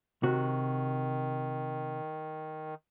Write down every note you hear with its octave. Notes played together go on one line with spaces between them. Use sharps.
C3 D#3 F#4